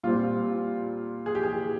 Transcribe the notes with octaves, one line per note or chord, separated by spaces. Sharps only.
A#2 G3 C4 F4
G#4
G4
G#4